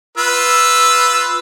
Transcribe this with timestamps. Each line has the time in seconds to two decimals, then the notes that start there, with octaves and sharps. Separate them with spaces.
0.18 F4 B4 E6